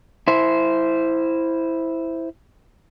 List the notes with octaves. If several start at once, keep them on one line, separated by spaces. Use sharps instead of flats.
E4 C5